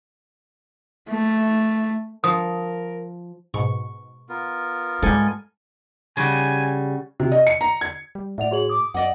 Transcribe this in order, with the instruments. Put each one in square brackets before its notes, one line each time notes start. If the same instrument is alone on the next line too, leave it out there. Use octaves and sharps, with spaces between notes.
[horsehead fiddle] A3
[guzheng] F3 [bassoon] A#4 [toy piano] D#6
[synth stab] G#2 B2 [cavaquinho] C#6
[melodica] B3 F4 A#4
[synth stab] G#2 G3 [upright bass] G#3 [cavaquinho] A4 G#5
[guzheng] C#3 G3 F#4 [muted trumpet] G#5
[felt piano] C3
D#5
C#7
A#5
G#6
[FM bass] G3
[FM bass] A2 [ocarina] D5 [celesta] E5 F#5 F7
[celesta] F#4 G#4 F#7 [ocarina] C#5
[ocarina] D6 [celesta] D#6
[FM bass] F#2 [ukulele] D5 D#5 F#5